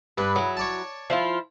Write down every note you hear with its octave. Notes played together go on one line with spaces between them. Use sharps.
G2 D4 B4
F#3 E4 G#4
C#5 D5 A5
F3 E4 F4